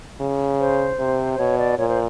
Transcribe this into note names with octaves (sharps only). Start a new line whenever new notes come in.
C#3
C5
C3
C5
B2 C#5
D5
A#2 C#5
C5